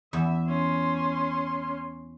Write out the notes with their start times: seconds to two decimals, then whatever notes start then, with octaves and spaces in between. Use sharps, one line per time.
0.13 E2 E5
0.48 C#4 C6